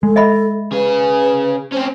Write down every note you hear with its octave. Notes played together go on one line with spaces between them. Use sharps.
G#3 A4
D#5 E5 B5
C#3 G#4 B4
C4 C#4 C5